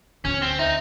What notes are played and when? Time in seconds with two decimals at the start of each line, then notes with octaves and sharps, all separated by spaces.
0.25 D2 C#4
0.42 C4
0.59 D#4 E5